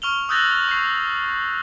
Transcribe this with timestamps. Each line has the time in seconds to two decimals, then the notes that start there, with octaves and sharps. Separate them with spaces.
0.02 C#6 F6 F7 G7
0.29 D#6 E6 F#6 G6 A6 A#6
0.69 C#6 C7